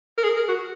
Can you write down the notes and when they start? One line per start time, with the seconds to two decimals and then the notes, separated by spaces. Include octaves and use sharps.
0.18 A#4
0.24 G#4
0.36 A#4
0.48 F#4